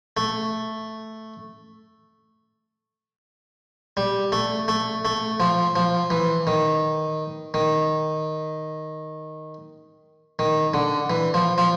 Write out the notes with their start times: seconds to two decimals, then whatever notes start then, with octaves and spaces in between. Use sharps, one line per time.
0.17 A3
3.97 G3
4.32 A3
4.68 A3
5.05 A3
5.40 F3
5.76 F3
6.10 E3
6.47 D#3
7.54 D#3
10.39 D#3
10.74 D3
11.10 E3
11.34 F3
11.58 F3